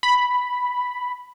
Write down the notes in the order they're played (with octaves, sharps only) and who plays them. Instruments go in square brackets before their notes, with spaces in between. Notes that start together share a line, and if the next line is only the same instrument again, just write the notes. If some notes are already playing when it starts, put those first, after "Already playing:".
[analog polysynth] B5